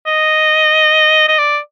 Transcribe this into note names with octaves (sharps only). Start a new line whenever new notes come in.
D#5
D#5
D5